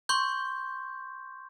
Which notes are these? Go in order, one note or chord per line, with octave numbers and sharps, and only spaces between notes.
C6 C#6 G6